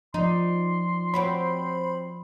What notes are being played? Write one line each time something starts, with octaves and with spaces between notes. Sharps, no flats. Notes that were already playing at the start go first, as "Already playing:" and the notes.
F3 D#4 D5 C6
C4 F#4 C#5 B5